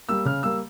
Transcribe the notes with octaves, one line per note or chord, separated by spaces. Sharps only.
G3 A#3 E6
C#3 F6
G3 A#3 E6